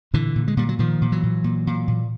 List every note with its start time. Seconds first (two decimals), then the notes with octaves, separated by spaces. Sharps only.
0.13 A#2 D3 E3
0.36 A#2
0.48 G#3
0.57 A#2 G3
0.69 F#3
0.79 A#2 D#3 F3
1.01 A#2
1.12 E3 F#3
1.23 A#2
1.44 A#2
1.67 A#2
1.88 A#2